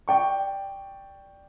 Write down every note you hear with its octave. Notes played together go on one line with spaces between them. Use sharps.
D5 G5 C#6